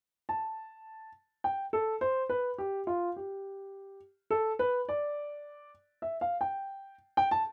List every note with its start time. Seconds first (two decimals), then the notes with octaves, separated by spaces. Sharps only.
0.29 A5
1.44 G5
1.73 A4
2.01 C5
2.29 B4
2.58 G4
2.87 F4
3.16 G4
4.30 A4
4.59 B4
4.89 D5
6.02 E5
6.21 F5
6.41 G5
7.17 G5
7.31 A5